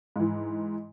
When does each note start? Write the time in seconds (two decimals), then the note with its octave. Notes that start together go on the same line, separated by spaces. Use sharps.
0.16 G#2 E3